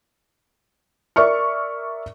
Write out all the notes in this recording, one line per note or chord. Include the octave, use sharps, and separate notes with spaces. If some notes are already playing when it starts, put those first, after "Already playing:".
A#4 D5 E5 C#6 F6